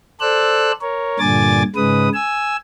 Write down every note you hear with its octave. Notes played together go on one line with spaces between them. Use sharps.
A4 C5 D5 E6 F#6
A#4 C#5
G2 A#2 D3 G#5 D6 A6
G#2 C#3 G#3 B4 D#6
G#5 E6